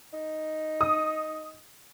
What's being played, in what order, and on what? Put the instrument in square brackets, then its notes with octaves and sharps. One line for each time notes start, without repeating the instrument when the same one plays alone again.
[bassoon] D#4
[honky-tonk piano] D#6